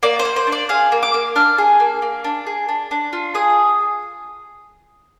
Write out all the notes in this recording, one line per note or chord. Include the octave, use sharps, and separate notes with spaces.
A#3 D5
C5
A#3
C5
D4
D5
G#4 F5
A#3
D6
A#3
D4 F6
G#4
A#3
A#3
D4
G#4
D4
D4
F4
G#4 D#6